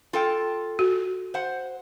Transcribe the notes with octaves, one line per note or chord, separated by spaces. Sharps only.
F4 A4 G5
F#4
C5 F#5